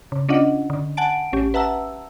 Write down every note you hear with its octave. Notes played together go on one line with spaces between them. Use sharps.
C#3
C#4 D4 F4 D#5 F#5
D3
F#5 G#5 A5 D7
A1 C#4 G4
B4 E5 F#5 A5 A#5 E6